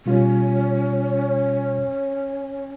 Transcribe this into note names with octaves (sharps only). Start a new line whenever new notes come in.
B2 G3 C#4 F4